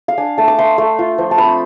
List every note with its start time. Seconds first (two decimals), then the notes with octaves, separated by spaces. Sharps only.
0.08 F5
0.17 D4 G#5
0.38 A3 A5
0.48 D6
0.59 A3 C6
0.78 A3
0.99 F4
1.18 F3
1.31 A5
1.38 C4 B5